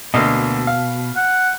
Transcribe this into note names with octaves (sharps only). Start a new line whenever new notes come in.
D2 B2 A#3 D#5
F5
F#5